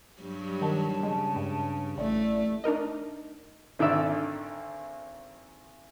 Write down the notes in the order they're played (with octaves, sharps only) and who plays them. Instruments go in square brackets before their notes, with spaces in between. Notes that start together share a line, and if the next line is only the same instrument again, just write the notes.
[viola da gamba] G2 F#3 G3
[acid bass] D#3 [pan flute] A5
[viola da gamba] C#3 [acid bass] G#3
[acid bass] G2
[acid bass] A1 [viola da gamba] A3 [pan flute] D5
[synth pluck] D4 D#4 A#4 D#5
[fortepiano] G#1 D3 D#3 D5 E5 E6